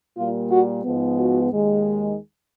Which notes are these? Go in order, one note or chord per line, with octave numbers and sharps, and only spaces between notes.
A#2 G3 A#3 F4
F#4
G#2 F3 G#3 B3
F#4
D#2 D#3 G#3